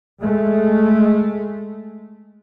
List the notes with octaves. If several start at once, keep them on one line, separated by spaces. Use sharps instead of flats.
G#3 A3